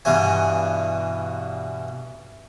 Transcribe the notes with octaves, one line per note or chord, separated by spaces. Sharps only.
G2 B2 E3 G#5